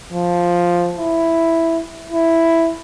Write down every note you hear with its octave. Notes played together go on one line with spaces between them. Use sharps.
F3
E4
E4